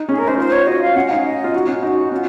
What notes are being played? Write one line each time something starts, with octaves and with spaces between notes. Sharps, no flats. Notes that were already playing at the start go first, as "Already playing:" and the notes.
Already playing: D#4
C#4 G#4
A#4
D#4 C5
F4 C5
C#5
F#4 D#5
F5
C#4 F#5
D#4 F5
D#5
F4
D#4 F#4
C#4 F4
D#4 F#4
C#4 F4